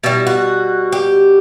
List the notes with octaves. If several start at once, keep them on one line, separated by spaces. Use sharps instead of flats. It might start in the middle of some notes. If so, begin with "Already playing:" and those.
B2 G3 E4
F#4
G4